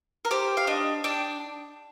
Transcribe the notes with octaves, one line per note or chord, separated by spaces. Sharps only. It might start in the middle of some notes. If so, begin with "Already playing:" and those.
A#4
G4 C5
F5
D4 D#5
D4 G5